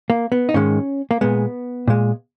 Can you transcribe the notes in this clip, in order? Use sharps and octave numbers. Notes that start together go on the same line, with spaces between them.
A#3
B3
D#4
G#2 D#3 G#3 C#4
A#3
A#2 G#3 B3
A#2 G#3